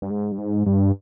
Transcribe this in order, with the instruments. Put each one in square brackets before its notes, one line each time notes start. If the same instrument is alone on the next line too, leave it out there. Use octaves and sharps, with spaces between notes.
[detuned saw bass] G2
G#2
G2
G#2
G2